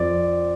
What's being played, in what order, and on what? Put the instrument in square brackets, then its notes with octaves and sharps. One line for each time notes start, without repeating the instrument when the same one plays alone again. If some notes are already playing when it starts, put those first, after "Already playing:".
Already playing: [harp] F2 [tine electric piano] D5